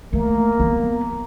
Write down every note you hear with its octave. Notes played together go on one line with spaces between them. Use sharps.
A3 A#3
B3